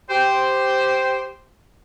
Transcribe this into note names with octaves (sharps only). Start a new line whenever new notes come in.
G4 C5